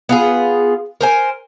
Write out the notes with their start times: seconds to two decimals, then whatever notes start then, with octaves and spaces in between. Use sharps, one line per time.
0.09 B3 F4 G#4
1.01 A#4 C5 G#5